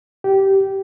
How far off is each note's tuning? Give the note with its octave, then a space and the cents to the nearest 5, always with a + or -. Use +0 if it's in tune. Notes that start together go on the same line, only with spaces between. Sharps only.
G4 -15